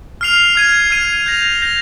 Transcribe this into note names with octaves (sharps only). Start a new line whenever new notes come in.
F6 C7 F7
F6 G#6 D#7
F6 G#6 D#7
G6 A#6 F7
G6 A#6 F7